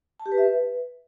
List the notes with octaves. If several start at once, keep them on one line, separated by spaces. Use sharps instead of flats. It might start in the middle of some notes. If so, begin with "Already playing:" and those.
A5
G4
B4
E5
B4